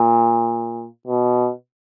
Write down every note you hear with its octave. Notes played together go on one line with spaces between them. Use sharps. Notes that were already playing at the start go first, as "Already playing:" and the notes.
Already playing: A#2
B2